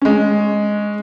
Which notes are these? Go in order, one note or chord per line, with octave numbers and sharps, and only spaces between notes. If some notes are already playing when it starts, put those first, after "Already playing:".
G#3 C#4